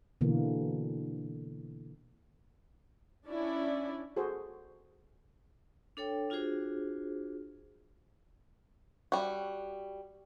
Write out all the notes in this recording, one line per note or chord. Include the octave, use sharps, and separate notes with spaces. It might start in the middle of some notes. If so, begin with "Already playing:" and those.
B2 D3 E3 A#3
C#4 D4 E4 D5
F#4 G#4 A4 C5
D4 A4 C#5 G5
D4 F4 F#4 G#4 C5
G3 F#4